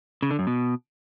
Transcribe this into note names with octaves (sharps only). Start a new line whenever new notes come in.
C#3
D3
F#2
B2